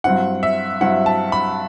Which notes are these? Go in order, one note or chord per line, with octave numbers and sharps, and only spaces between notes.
G2 F#3 C4 E4 F#5
E5
G2 F#3 C4 E4 F#5
A5
B5